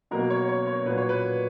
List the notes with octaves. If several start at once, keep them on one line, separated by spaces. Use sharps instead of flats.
B2 F#3 A#3 A#4
C#5
C#5
C#5
A#2 F#3 A#3 B4
C#5
B4